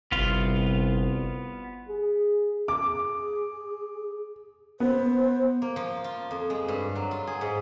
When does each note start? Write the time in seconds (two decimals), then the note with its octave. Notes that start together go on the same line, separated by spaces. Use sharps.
0.12 G1 C2 B3 F4
1.89 G#4
2.68 G#4 D6
4.80 B3 C5
5.62 A#3
5.76 F3
6.04 F4
6.31 F2
6.50 G#3
6.68 G2
6.95 F#3
7.11 F4
7.27 G#4
7.41 G#2